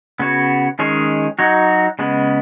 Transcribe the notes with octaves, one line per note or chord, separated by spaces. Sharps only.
C#3 B3 F#4 C#5
D#3 G#3 C#4 G#4 C#5
F#3 D#4 F#4 C#5
C#3 G#3 B3